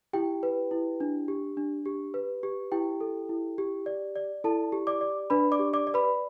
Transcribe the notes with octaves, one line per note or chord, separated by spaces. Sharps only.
E4 G4 G5
B4
E4
D4
G4
D4
G4
B4
G4
E4 G4 G5
A4
E4
G4
D5
D5
E4 A4 A5
G4
D5 D6
D5
D4 B4 B5
D5 D6
G4
D5 D6
D5
B4 B5